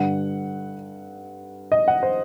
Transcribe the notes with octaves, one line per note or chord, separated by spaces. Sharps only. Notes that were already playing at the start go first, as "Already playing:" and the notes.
Already playing: G2 D3 F#5
D#5
F#5
C5